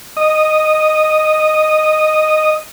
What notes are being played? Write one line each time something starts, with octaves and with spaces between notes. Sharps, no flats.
D#5 D#6